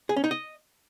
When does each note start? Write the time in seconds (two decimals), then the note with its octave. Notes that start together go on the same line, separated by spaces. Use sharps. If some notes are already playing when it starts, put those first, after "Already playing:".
0.09 G#4
0.16 C#4
0.24 D#4
0.31 D#5